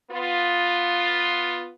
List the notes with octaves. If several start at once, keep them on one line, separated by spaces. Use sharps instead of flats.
B3 F4